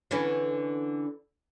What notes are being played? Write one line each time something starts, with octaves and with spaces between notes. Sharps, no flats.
D3 E3 C#4